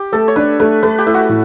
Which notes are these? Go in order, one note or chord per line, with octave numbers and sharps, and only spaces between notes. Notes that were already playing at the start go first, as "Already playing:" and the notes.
Already playing: G4
A3 A4
C#5
D4 B4
A3 B4
A3 B4
G4
A3 E4
F#4
A2